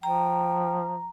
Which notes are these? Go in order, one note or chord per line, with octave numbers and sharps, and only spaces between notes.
F3 G5 A#5